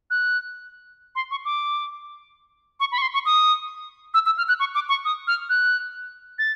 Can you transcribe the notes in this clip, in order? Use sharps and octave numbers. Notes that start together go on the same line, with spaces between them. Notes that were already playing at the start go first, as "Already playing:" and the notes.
F#6
C6
C#6
D6
C#6
B5
C#6
C6
C#6
D#6
E6
E6
F6
F#6
C#6
D6
C#6
D#6
F6
F#6
A6